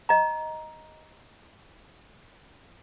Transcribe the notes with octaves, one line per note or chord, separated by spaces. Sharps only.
D#5 A#5